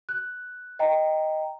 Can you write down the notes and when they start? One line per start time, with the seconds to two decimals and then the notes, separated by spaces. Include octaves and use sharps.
0.09 F#6
0.79 D#5 G5 A#5